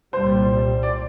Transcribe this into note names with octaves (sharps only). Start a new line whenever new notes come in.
C2 A#2 G3 C5
D5